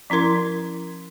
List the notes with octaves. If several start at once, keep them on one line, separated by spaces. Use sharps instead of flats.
F3 C#4 E4 A#4 C6